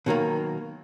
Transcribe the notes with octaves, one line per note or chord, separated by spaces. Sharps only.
B2 D#3 F#3 A#3